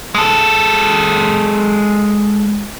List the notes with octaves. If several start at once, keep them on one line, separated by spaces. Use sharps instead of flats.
G#3 A4